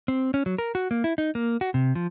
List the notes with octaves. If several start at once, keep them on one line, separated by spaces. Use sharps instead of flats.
C4
C#4
F#3
A#4
F#4
A#3
E4
D#4
A#3
F#4
C3
F3